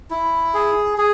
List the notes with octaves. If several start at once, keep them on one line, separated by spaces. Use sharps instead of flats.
E4
G#4
G#4